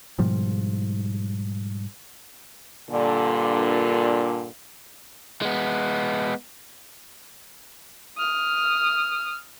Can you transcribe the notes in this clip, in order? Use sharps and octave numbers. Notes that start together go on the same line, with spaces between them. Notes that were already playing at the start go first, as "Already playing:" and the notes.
G#2 B2 F3 G3
G2 A#2 D3
G#3 B3
D#6 F6